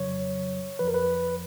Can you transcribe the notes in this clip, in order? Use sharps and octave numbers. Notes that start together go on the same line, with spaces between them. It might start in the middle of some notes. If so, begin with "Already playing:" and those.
Already playing: F2 C#3 F#3 C#5
F2 F3 B4
A#4
B4